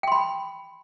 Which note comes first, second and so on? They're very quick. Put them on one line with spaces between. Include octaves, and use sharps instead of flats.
G5 C6 B5